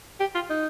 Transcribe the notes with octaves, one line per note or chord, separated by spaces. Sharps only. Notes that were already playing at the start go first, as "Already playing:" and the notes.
G4
F4
D#4